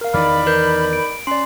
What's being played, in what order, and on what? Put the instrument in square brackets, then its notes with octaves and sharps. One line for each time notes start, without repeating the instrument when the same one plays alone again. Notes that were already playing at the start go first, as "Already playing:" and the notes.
[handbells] A#4 F5
[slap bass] E2 D#3 E3 [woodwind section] D#4 D5 B5 [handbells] F6
[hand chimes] A#4 B4 G6
[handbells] D7
[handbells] C#4 D5 [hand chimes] C6